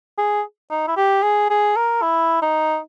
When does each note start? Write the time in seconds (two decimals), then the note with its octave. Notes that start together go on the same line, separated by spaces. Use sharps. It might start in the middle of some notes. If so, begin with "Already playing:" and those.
0.18 G#4
0.71 D#4
0.88 E4
0.97 G4
1.23 G#4
1.50 G#4
1.77 A#4
2.02 E4
2.42 D#4